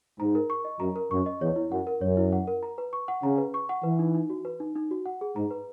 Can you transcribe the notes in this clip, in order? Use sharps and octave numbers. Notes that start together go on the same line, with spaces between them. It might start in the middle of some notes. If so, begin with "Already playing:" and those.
G#2 A#5
A#4
C#6
D#5
F#2 A#5
A#4
F#2 C#6
D#5
E2 C#5
E4
F#2 F#5
A#4
F#2 C#5
E4
F#5
A#4
A#5
B4
C#6
F#5
C#3 A#5
B4
C#6
F#5
E3 B4
D#4
D#4
F#4
B4
D#4
D#4
F#4
F#5
G#4
G#2 A#5
B4